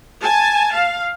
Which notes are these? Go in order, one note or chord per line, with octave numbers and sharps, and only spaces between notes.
G#5 A5
F5